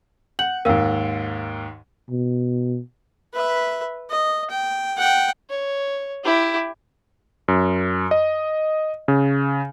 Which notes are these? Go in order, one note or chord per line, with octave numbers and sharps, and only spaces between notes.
F#5 G6 F#7
D#2 G#2 A#4 F5 E6
B2
B4 E5
D#5
G5
F#5 G5
C#5
E4 G4
F#2
D#5
C#3